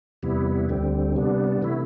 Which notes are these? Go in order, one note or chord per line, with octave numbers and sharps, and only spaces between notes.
E2 C3 G3 B3 E4
D2 D3 G3 C4
C3 G3 B3 D4
C3 E3 A3 E4